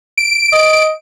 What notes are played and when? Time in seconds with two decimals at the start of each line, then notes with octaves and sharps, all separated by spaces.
0.18 D7
0.52 D#5